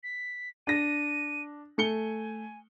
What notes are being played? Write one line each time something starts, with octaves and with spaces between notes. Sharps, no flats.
B6
D4 A#6 D#7
A3 G#5 C#7 G7